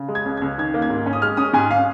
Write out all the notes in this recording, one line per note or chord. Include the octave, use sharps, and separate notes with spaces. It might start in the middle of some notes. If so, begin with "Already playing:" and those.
Already playing: C#3
G#3
G#6
C#2
C#2 G#6
D#3 G#6
A#3
G#6
G#2
C#4
D#6
G#3 F6
C#4 D#6
G#2 G#5
F5